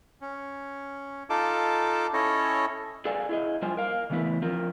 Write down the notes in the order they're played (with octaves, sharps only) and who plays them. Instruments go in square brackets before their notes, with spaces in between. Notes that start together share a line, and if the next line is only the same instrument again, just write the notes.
[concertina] C#4
D#4 F4 A4 A5 D6
C#4 E4 A4 C#5 D#5
[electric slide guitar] G#4 A4 B4 D5 F5 G#5
E4 G#4 D#5
F2 G3 F4 C5 D#5 G#5
A#4 F5
C#3 E3 A3 B3 E4 B4
F3 C4 F4 A#4